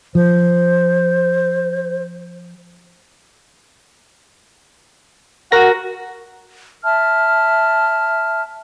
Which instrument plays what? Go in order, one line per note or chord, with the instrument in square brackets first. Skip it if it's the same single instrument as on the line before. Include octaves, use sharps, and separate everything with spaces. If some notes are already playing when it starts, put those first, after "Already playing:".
[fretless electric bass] F3 [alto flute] C5
[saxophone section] F#4 [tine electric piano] A#4 A#6
[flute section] E5 A5 F6